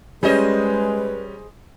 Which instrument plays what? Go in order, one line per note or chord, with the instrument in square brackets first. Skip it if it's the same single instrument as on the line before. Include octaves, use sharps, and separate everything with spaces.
[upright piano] G3 C#4 [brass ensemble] G#3 [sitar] G#4 C5 D#5 [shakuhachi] B4